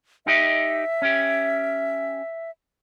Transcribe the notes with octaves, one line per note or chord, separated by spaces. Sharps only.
D#4 G4 D#5 E5
C#4 G4